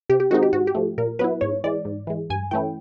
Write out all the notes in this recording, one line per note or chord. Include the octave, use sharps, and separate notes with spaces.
C3 G4
G4
D#3 G#3 C4 D#4 F#4
G4
G#2 F#4
G4
F3 A3
A#2 A#4
F#3 B3 E4 B4
G#2 C#5
E3 G#3 D5
G#2
E3 G#3
G2 G#5
E3 A3 C#4 E4 G5